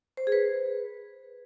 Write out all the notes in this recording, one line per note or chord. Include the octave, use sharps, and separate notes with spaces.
C5
G#4
B4